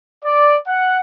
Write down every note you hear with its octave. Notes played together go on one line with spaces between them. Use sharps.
D5
F#5